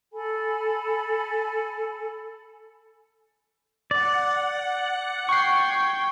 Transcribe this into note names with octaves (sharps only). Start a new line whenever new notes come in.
A4 G#5 B5
D5 F#5
G5 C#6 G#6 C7